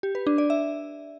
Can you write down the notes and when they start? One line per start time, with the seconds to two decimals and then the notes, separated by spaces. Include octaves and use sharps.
0.03 G4
0.15 B4
0.27 D4
0.38 D5
0.50 E5